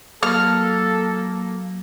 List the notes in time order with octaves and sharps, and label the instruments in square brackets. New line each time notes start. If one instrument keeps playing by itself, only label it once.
[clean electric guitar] F#3 [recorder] A#3 [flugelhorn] A4 [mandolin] F6